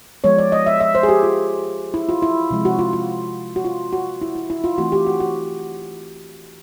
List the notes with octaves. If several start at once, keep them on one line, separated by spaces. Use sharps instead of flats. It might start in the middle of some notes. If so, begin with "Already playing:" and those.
F3 G#3 B3 C#5
D5
D#5
E5
E5
C5
G#4
G4
F4
E4
F4
E4
C3 F3 G#3 C4
F#4
F4
F4
F#4
F4
F#4
E4
E4
E4
F4
E3 A3 C4 E4 F#4
G4
F#4
F#4